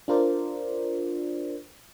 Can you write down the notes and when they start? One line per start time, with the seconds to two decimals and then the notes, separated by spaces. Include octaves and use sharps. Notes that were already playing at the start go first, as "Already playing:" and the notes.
0.08 D4 F4 A#4 C5 D5